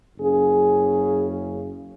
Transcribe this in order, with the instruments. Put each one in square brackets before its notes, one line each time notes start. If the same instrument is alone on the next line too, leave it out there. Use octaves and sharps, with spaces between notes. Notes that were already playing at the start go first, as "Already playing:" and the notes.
[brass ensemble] F#1 F#2 C#3 G#4